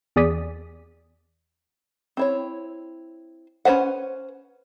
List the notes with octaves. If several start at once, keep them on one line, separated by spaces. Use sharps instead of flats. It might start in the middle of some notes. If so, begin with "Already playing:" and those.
E2 G#4 D5 D#6 B6
C4 E4 C#5
C#4 D#4 B4 C5 F#5